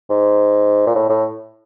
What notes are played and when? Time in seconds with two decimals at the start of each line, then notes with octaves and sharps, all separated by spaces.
0.10 G#2
0.86 A#2
0.95 A2
1.09 A2